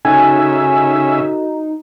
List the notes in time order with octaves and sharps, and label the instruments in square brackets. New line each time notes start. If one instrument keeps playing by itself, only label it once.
[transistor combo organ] C#3 E5 [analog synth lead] D#4 [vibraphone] F#4 A4 [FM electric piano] G#5